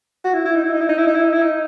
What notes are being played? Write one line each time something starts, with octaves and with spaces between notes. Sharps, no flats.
F#4
E4
E4
D#4
E4
D#4
E4
D#4
E4
D#4
E4
D#4
E4
D#4